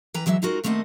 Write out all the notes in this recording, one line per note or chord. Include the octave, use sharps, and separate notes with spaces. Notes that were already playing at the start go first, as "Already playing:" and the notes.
E3 B4 G5 A#5
E3 F#3 G#3 D5 E5
G#3 D#4 F4 F#4 A#4
D#2 A3 A#3 C4 D#5 F#5